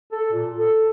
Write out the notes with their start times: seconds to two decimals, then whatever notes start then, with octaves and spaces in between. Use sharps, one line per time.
0.12 A4
0.31 A#2
0.57 A4